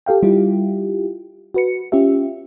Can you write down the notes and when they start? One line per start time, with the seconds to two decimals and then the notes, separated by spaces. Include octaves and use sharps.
0.06 G4 A4 F5 G5
0.23 G3 E4 F4 G4
1.54 F#4 B4 C#7
1.92 C#4 F4 G4 E5